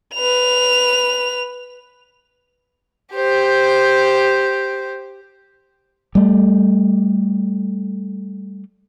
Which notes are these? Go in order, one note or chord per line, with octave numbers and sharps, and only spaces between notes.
B4 F7
G4 C5
G3 A3